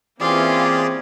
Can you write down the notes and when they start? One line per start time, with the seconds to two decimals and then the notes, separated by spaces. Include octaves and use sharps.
0.21 E3 A#3 C4 C#4 F4 G4 G#4 D5